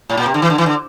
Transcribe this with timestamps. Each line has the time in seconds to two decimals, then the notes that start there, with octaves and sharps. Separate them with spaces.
0.09 A2
0.17 A#2
0.26 C3
0.34 D3
0.42 E3
0.50 D3
0.58 E3
0.66 D3